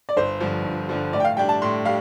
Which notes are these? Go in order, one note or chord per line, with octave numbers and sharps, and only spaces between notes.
D5
G1 C5
G2 D3 F3
G1
G2 D3 F3
A2 D5
G5
F5
G3 D4 G5
A5
A2 C6
G3 F5